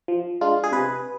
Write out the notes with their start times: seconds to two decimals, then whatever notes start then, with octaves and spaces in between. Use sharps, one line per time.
0.08 F3
0.41 G#3 D4 F4
0.64 G#4
0.72 C3 B4